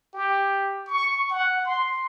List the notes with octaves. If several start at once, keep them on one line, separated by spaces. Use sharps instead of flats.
G4
C#6
F#5
C6